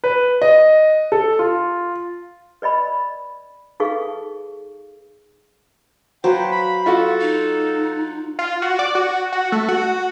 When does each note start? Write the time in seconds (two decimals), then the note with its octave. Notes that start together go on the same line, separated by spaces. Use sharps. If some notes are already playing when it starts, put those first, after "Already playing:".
0.04 B4
0.42 D#5
1.12 A4
1.39 F4
2.62 B4 D5 D#5 B5
3.80 D#4 G#4 A4 B4 F5 C#6
6.24 F#3 B4 C5 F5 G5
6.52 B5
6.86 F4 F#4 A4 C#6
7.21 D#4
8.39 F4
8.62 F#4
8.79 D5
8.95 F#4
9.32 F#4
9.52 A3
9.68 F#4